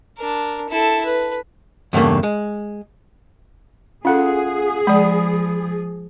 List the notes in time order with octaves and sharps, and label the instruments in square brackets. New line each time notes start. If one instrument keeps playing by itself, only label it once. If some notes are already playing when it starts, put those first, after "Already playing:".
[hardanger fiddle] D4 A#4
E4 A4
B4
[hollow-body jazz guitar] E2 G2 C#3 A3 A#3
G#3
[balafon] C#4 A4 [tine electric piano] F4 F#5 [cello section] G#4
[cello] F3 [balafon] G#3 D5 [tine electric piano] B5 D#6